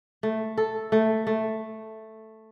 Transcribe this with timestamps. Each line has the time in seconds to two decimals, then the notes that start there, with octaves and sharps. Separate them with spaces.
0.23 A3
0.57 A4
0.92 A3
1.27 A3